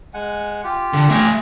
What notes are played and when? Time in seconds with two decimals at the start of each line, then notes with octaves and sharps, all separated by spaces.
0.14 G#3 F#5 G#5
0.64 F4 G4
0.93 D3
1.09 A3 G#5